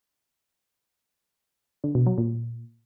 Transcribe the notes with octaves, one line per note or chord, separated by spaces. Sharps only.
D3
B2
F#3
A#2